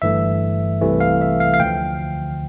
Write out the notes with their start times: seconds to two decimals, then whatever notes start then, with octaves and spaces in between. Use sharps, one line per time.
0.02 G1 G2 E3 A3 E5
0.81 C2 C3 E3 A3
1.00 F5
1.21 E5
1.40 F5
1.54 F5
1.60 D2 D3 F3 G5